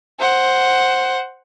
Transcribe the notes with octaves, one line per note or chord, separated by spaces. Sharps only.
C5 F#5